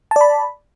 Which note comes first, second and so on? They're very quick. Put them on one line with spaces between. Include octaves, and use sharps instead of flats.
A5 D5 B5